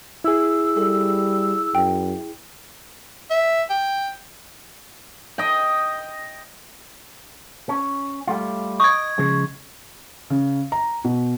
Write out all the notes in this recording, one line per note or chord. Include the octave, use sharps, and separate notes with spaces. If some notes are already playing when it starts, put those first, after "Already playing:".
E4 G#4 E6
G3 A4
F#2 G5
E5
G5
D#5 G5
C#4
G3 A3 F4
D#5 C#6 G#6
C#3 F3 G#3
C#3
A#5
B2